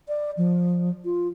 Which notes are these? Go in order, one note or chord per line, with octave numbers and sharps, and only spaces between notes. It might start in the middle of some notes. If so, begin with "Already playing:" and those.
D5
F3
F4